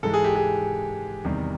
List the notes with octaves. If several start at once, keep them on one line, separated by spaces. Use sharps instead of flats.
G#2 E3 G#3 A4
G#4
G4
G#4
E2 C3 D#3 G3